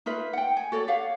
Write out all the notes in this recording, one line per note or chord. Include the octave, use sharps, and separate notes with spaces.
D#4 F4 B4 E5
F#5 G5
G#5
F#4 A4 C#5 D5
G4 C#5 F5 F#5